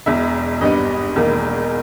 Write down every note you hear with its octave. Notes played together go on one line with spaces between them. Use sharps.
E1 E2 B2 E5
G#1 G2 G3 B3 D#5
E1 E2 D#3 A#3